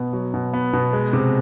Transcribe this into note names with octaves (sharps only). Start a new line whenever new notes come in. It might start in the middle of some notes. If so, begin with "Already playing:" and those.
Already playing: B2 B3
F#3
B2
B3
B2
G#3
C3